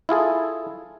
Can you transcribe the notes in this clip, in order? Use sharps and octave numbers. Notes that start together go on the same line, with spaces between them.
E4 F4 G#4 A4